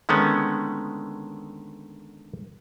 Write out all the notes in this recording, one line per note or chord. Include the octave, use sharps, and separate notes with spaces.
D3 D#3 G#3 A3 B3 C#4